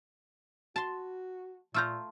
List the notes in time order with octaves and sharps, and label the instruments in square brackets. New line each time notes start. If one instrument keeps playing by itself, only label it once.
[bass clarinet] F#4 [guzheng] A5 C6
[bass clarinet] A#2 [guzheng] A3 F4 A#5 [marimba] E6 F6 G6